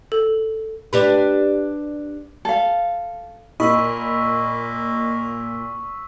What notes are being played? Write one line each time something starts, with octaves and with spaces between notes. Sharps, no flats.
A4
D4 G4 B4
A4 F5
A#2 A#3 D#5 B5 C#6 E6 B6